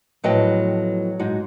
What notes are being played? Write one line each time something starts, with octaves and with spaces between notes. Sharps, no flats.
A2 F3 F#3 B3 D#5 G5
G#2 D#4 F#4